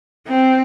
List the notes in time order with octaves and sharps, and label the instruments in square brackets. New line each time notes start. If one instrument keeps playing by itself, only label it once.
[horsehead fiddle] C4